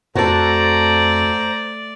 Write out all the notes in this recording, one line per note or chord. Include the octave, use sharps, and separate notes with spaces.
F2 A3 F#4 A4 C5 D5 A#5